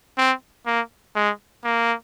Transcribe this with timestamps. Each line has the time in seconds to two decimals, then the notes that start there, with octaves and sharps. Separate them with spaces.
0.17 C4
0.66 A#3
1.15 G#3
1.64 A#3